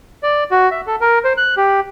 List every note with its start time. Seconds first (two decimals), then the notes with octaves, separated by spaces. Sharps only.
0.23 D5
0.51 F#4
0.71 E5
0.87 A4
1.01 A#4
1.24 C5
1.37 F#6
1.57 G4